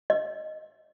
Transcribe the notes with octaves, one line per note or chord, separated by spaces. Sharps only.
D#5